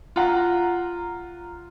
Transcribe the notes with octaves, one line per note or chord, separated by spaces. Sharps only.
F4 F#5 A#5